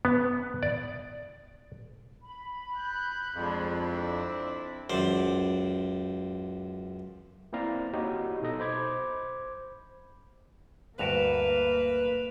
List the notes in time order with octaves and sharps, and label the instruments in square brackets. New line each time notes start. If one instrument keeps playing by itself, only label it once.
[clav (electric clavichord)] B3
D5
[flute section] B5
[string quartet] F#6 G6
[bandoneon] F2 [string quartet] F3 G#3 D4
[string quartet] C4 D4 E4
[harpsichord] C#2 F#2 C5 D5
[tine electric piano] A#3 C4 E4 D5 F5 A#5
D#4 F#4 G4 C#5 D#5
B2 D#4 A4 D#5
C5 B5 D6 G#6
[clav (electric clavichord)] D2 G2 F#4 [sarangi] A#3 [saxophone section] B4 [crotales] D7 E7 F7